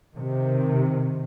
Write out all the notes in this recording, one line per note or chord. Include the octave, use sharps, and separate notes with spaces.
C3 D#3